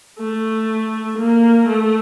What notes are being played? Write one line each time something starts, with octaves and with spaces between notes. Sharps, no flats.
A3
A#3
A3